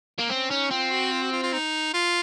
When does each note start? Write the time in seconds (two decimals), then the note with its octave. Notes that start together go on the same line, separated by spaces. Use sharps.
0.19 A#3
0.30 C4 C#4
0.50 C#4 D#4
0.70 C4 F4
0.91 F#4
1.12 F4
1.22 F#4
1.32 F4
1.43 F4
1.53 D#4
1.93 F4